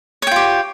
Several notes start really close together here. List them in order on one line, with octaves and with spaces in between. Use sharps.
C#5 G5 F4 G4